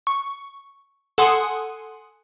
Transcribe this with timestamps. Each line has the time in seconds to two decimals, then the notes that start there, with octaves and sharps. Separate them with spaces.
0.07 C#6
1.18 A4 F#5 G#5 C6 D#6